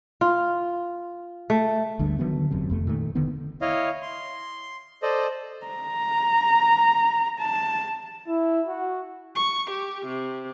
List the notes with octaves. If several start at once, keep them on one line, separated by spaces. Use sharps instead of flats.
F4
A3
G1 D2 G2 D3
D3 D#3 F#3 B3
E1 F#2 C3
F1 F2 A3
A#2 D#3 A3
E1 D3 D#3 B3
E4 C#5 D#5 F5
C6
A4 C5 D5 D#5
A#5
A5
E4
F#4
C#6
G4
C3